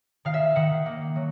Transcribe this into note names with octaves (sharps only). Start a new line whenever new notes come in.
D#3 F5
E5
F5
D#3 F#5
A#3
F#3